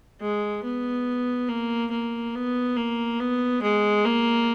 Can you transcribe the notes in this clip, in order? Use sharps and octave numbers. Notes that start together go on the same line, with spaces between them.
G#3
B3
A#3
A#3
B3
A#3
B3
G#3
A#3